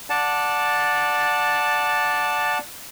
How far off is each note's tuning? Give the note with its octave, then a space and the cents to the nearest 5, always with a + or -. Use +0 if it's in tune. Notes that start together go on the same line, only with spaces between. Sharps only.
D5 +0 F#5 -20 A5 +0